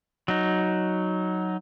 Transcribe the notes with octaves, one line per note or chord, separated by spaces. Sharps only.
F#3 D#4